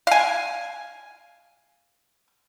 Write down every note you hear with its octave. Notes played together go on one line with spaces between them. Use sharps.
F5 G#5